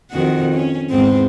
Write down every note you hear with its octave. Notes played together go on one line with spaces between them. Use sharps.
F2 D#3 F#4
C#4
E2 G#2 C4